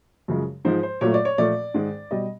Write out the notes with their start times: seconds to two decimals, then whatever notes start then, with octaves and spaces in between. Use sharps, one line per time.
0.28 F#2 C#3 F3 G#3
0.65 G#2 F3 G#3 C5
0.83 C5
1.01 A#2 F#3 A3 C#5
1.14 D5
1.25 C#5
1.38 A#2 F3 A3 D5
1.74 G#2 D#3 G#3
2.11 B2 G3 D#5